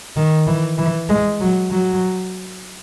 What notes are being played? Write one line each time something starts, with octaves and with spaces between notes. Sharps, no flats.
D#3
E3
E3
G#3
F#3
F#3